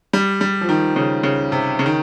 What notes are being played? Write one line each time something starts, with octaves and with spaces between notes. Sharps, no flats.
G3
G3
F3
D#3
C#3
C#3
C3
C#3
D#3